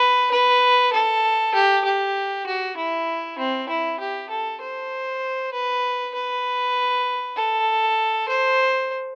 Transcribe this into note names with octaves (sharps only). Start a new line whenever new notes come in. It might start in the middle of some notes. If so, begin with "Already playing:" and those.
Already playing: B4
B4
A4
G4
G4
F#4
E4
C4
E4
G4
A4
C5
B4
B4
A4
C5